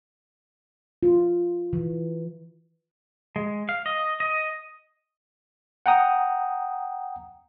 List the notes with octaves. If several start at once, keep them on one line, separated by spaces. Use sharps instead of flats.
F4
E3
G#3
F5
D#5
D#5
F#5 G5 A#5 D#6